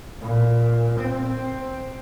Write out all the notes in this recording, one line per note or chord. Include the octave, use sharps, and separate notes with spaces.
A#2
C4